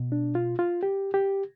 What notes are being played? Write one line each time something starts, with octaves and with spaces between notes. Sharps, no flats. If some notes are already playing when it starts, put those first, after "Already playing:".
Already playing: B2
D4
F4
F4
G4
G4